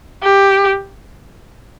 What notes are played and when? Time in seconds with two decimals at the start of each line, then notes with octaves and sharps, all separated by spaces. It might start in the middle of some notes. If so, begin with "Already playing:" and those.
0.23 G4